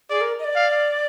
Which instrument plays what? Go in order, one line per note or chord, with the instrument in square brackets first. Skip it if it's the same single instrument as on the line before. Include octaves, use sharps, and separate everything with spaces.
[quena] G#4 [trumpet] D5
[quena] A#4
D#5
D5
[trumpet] F5